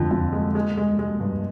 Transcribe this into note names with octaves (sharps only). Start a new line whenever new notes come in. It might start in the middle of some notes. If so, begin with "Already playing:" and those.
Already playing: F2 D3
F2
G#3
G#3
G#3
G#3
G2